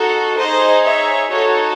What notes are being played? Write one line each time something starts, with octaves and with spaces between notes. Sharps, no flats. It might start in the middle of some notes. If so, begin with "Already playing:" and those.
Already playing: D#4 F#4 A4
D#4 G#4 C5 D#5
C#5 E5
D#4 F#4 A4 C#5